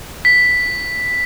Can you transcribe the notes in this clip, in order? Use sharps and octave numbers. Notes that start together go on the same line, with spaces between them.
B6